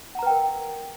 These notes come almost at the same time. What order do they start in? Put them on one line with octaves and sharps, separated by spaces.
F#5 A#5 B4 G5 A#4